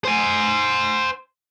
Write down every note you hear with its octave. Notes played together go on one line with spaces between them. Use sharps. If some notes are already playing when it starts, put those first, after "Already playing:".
C5 G#5